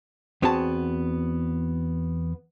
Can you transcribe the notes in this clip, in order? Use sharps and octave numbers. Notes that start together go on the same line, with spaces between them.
E2 B3 C4 F#4 G#4 A5